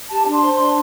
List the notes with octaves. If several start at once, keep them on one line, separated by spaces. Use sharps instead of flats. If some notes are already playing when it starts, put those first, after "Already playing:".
G4 A5
D4
C6
C5
C6
D4